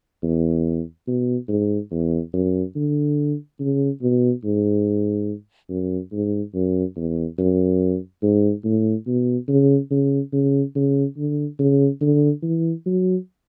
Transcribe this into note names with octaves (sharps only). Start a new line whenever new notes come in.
E2
B2
G#2
E2
F#2
D3
C#3
B2
G#2
F#2
G#2
F#2
E2
F#2
G#2
A2
B2
C#3
C#3
C#3
C#3
D3
C#3
D3
E3
F#3